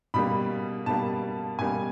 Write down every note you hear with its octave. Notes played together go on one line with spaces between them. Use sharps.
B2 G3 A#3 B5
B2 G3 A#3 A5
B2 G3 A#3 G#5